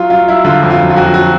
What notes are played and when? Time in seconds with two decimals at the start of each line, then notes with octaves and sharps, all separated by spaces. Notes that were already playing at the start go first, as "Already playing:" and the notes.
Already playing: F#3 F4
0.10 F#3 F4
0.28 F#3 E4
0.44 D3 F4
0.63 F2
0.70 F4
0.79 F#3
0.90 F4
0.96 F2 F#4
1.14 F#3 F#4